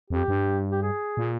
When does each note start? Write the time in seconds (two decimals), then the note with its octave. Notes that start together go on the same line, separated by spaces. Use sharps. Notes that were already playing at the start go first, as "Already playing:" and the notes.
0.10 F2 G4
0.28 G2
0.71 G4
0.82 G#4
1.17 A#2